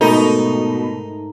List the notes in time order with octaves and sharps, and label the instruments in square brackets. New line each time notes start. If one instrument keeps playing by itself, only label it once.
[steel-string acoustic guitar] G#2 A3 A#4 [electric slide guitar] B2 [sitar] D#4